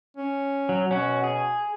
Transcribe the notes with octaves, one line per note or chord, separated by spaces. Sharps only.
C#4
F#3
B2 C#4 F#4
G#4